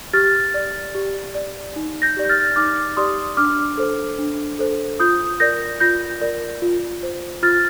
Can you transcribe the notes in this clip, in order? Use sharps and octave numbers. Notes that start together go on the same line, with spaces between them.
G4 F6 A6
D5
G4
D5
D#4
G6 A#6
G4 D5
G6
F6 A6
D#4 D6 F6
G4 D5 C6 D#6
D4 D6 F6
A4 C5
D4
A4 C5
F4 D#6 G6
A#4 D5 G6 A#6
F4 G6 A#6
A#4 D5
F4
C5
F4 F6 A6